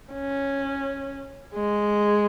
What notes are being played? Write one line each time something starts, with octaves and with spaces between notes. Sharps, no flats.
C#4
G#3